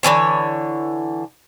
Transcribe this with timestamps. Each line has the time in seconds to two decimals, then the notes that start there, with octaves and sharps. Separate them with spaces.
0.03 D3 E3 C#4 C#5